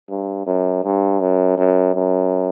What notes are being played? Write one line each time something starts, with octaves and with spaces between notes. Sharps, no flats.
G2
F#2
G2
F#2
F#2
F#2